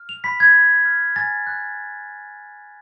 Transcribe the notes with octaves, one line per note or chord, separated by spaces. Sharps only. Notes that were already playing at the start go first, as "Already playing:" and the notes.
Already playing: F6
F7
B5 B6
G#6
B5
F6
G#5 A6
F#6